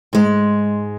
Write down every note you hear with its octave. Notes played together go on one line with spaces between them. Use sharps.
G#2 G#3